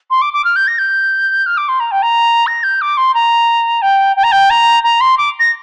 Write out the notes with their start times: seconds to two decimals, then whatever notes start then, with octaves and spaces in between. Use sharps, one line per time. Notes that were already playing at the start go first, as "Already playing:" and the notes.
0.11 C6
0.22 D6
0.33 D6
0.45 F6
0.56 G6
0.67 A#6
0.79 G6
1.46 F6
1.57 D6
1.68 C6
1.80 A#5
1.91 G5
2.02 A#5
2.47 A#6
2.63 G6
2.81 D6
2.97 C6
3.14 A#5
3.82 G5
4.16 G5
4.24 A#5
4.32 G5
4.50 A#5
4.83 A#5
5.01 C6
5.18 D6
5.40 A#6